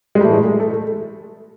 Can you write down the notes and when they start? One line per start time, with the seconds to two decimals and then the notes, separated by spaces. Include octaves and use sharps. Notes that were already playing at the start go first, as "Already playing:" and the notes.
0.15 G#3
0.20 A2 E3 G3 A3
0.34 G#3
0.46 G#3
0.60 A3
0.73 A3